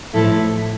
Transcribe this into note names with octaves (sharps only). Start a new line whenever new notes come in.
A2 F3 A3 E4 A4